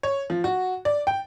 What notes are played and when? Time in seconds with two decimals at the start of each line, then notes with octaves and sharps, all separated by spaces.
0.03 C#5
0.30 F3
0.44 F#4
0.85 D5
1.07 G5